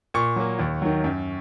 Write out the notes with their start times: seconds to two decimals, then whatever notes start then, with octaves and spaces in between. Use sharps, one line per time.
0.14 A#2 C#6
0.36 F#3 A#3
0.59 D#2
0.82 D#3 F#3
1.04 F#2